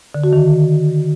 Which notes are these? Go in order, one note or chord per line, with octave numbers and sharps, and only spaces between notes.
D3
F#4
D#3